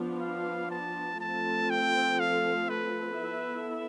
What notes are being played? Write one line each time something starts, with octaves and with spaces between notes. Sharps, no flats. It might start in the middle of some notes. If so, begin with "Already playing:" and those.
Already playing: F3 B3 D4 F4
F5
A5
F3 A3 C4 F4 A4 A5
G5
F5
B4
B3 E4 A4 E5